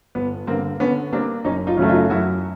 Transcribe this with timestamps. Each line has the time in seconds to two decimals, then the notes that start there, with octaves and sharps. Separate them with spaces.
0.15 G1 B3
0.47 G2 D3 A#3 C4
0.80 D3 B3 C#4
1.12 G3 A#3 C4 D4
1.45 F#1 C#4 D#4
1.67 D#4 F4
1.77 F#2 C#3 F#3 A3
1.88 D#4 F4
2.10 F#2 E4 F#4